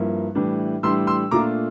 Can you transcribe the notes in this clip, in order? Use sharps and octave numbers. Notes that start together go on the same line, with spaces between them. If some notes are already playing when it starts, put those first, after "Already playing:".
Already playing: G2 F3 A#3 E4
A2 E3 G3 D4
A2 E3 G3 D4 C6 E6
C6 E6
A#2 A3 D4 F4 A#5 D6